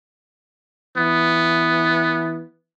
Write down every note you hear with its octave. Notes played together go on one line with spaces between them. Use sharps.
E3 B3